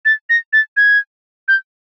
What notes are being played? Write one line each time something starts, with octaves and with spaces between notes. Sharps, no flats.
A6
A#6
A6
G#6
G6